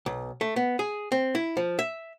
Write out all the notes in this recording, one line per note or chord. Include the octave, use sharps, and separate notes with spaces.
B1
A3
B3
G#4
C4
E4
F3
E5